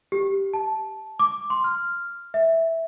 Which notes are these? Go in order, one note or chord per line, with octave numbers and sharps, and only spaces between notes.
G4
A5
D6
C6
F6
E5